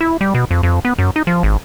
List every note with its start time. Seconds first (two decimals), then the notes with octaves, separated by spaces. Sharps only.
0.01 E4
0.21 G3
0.35 B2
0.51 F2
0.63 F2
0.85 B3
0.98 F#2
1.16 D#4
1.27 F3
1.43 G#1